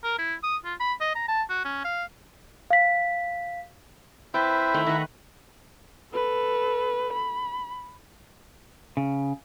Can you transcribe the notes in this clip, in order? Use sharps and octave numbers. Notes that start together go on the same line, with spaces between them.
A#4
E4
D#6
F4
B5
D#5
A#5
A5
F#4
C#4
F5
F5 B6
C4 E4 B4 C5 G5 A5
D#3 A3
D#3 B4 E5 F#5 A#5
A4 B4
B5
C#3